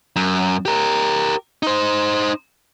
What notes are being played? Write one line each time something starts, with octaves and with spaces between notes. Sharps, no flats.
F#2
G4 A#4
D#4 C5